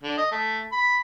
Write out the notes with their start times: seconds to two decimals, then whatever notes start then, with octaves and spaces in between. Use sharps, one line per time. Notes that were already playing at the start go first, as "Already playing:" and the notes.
0.03 D3
0.17 D#5
0.31 A3
0.72 B5